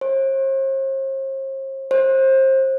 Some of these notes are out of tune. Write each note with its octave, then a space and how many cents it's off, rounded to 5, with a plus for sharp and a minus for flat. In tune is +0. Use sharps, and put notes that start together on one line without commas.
C5 +45
C5 +30